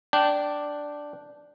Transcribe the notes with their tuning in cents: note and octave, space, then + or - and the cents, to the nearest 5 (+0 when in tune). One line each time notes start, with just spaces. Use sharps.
D4 +0 G5 -15